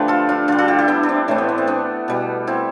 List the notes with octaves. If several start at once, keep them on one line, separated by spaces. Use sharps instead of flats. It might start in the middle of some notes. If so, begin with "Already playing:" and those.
Already playing: D3 F3 A3 G4 B4
F4 A4
D4 F4
D3 G3 F4 A4
F4 A4
E4 G4
E4 G4
B3 D4
D4
C4
A2 E3 A3 C4
B3
B3
C4
B3 D4
B2 G3
C4 E4